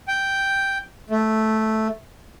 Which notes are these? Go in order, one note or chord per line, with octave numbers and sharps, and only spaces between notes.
G5
A3